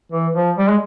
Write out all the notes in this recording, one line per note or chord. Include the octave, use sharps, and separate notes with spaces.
E3
F3
G3
G#3